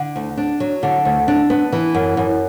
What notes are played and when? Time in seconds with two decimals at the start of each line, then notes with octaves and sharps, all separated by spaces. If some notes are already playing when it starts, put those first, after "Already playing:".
Already playing: D3
0.16 D2
0.37 D4
0.60 F#3
0.83 D3
1.05 D2
1.28 D4
1.50 B3
1.72 E3
1.95 F#2
2.17 F#2